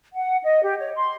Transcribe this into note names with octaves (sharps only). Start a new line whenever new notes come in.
F#5
D#5
G4
C#5
C6